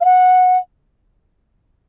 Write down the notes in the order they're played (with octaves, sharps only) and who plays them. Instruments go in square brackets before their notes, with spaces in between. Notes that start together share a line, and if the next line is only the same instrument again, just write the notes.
[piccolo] F5
F#5